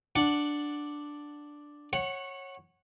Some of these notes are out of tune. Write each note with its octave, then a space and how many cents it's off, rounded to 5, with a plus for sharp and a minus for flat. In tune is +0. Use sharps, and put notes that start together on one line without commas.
D4 +0 F#5 +0
C#5 -20 F#5 +5